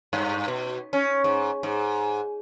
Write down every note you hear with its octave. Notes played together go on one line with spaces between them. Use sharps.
G2
B2
C#4
G#2
G#2